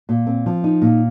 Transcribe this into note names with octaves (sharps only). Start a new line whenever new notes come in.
A#2
C4
F3
D#4
A#2